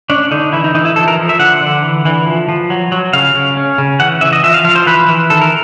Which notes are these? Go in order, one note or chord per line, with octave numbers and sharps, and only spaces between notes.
C#4 D4
D3 D#4
E3 E4
D#4
E3 D#4
E4
F3 A4
A#4
F3
E5
D3 F#5
D3
E3
E3
F3
F3
F#3
F#3
C#3 F5
C#3
C#4
C#3
E3 F#5
E3 E5
D#5
F3 E5
F5
F3 F5
C5
E3 B4
E3
D#3 A4
A#4